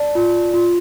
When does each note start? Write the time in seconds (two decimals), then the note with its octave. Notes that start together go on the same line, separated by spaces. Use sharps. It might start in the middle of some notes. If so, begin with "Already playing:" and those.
Already playing: D5 A5
0.15 F4
0.54 F4